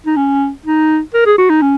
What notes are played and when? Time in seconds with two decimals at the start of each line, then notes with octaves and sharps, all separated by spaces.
0.06 D#4
0.16 C#4
0.65 D#4
1.14 A#4
1.26 G#4
1.38 F#4
1.50 D#4
1.62 C#4